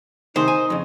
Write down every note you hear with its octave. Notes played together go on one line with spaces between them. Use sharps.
C3 D#3 D#4 G#4 C5
G#5
F2 C#3